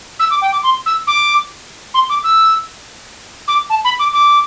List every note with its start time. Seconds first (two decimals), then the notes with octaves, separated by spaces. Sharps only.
0.20 E6
0.31 D6
0.42 G5
0.52 D6
0.63 C6
0.86 E6
1.07 D6
1.94 C6
2.10 D6
2.24 E6
3.48 D6
3.70 A5
3.85 B5
3.99 D6
4.13 D6